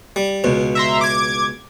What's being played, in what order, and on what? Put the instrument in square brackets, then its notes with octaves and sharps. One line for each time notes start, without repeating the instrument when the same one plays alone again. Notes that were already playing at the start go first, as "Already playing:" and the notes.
[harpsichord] G3
C#2 B2
[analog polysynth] E5 A#5 C6
D6 G#6